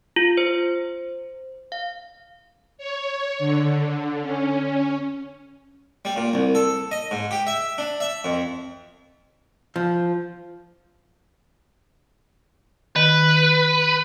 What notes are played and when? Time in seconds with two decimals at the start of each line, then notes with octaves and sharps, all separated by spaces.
0.16 F4
0.37 C5
1.72 F5
2.78 C#5
3.39 D3
4.22 C#4
6.05 G3
6.16 A#2
6.34 C2
6.55 A4
6.91 D#5
7.11 G#2
7.31 G4
7.47 E5
7.78 D4
8.00 E5
8.24 F2
9.76 F3
12.96 D#3 B4